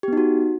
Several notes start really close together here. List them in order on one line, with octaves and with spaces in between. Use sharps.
G4 B3 D#4 F#4